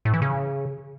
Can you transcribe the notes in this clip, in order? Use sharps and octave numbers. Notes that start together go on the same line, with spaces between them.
A2
E3
C#3